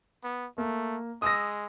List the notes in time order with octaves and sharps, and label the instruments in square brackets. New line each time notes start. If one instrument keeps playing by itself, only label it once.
[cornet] B3
[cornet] A3 [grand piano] A#3
[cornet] G#3 [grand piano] D#6 E6 A#6